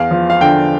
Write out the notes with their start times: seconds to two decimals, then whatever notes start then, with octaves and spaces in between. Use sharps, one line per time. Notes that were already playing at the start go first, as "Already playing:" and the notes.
Already playing: E2 F5
0.11 F3
0.30 F5
0.41 D3 G5